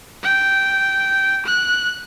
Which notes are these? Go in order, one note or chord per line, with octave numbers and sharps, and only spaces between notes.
G5
F#6